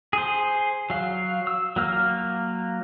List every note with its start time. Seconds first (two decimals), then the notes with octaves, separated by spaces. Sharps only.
0.13 G#4 C5
0.90 F#3 F5
1.47 E6
1.76 F#3 A#3 F6